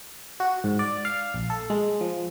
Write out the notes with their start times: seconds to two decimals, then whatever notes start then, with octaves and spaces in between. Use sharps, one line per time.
0.40 F#4
0.64 G#2
0.79 D5
1.05 F5
1.34 A#1
1.50 A4
1.70 G#3
2.01 F3